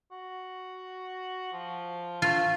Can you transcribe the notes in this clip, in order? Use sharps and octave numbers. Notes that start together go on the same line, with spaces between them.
F#4
F3
A3 F4